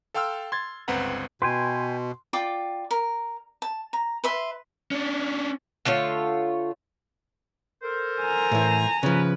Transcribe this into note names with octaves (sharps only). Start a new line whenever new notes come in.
A4 F5 G5 C6 E6 F6
C6 G#6 A6
G1 C#2 C4 B4 F#5 A#5
B2 B4 G5 G#5 C6
F4 D5 G5 D6
A#4
A5
A#5
B4 E5 C6
C#4 D4
D3 A3 F4 C#5
A4 A#4 C5
G#5 A#5
A2 E3
C#3 F3 B4